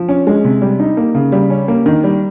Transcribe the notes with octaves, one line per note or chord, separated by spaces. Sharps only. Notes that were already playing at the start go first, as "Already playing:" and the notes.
Already playing: F3
C#4
G#3
C3
G3
D#4
A#3
C#3
G3
C#4
A#3
D#3
G3